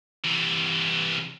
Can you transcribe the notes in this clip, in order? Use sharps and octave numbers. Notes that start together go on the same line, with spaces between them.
C3 E3